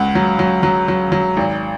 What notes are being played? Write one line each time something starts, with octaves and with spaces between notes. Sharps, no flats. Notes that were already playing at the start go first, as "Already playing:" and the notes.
Already playing: C#2 F#5
F#3
F#3
F#3
F#3
F#3
G#1